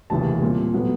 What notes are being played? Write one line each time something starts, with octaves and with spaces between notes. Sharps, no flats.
F1 D#2 C#3 E3 A5
A#2 G3 C4
A2 F#3 B3